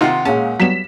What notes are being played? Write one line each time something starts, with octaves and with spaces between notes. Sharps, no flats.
C3 D#3 D#4 F4 F#5 C6
A#2 G#3 C#4 A5
F#3 G3 B3 B6 E7